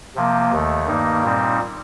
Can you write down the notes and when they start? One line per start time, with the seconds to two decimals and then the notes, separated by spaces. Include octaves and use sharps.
0.15 C3 F3 A#3
0.52 D#2 D#3 A3
0.87 G2 D#3 A#3 D#4
1.24 A#2 G3 C4 D#4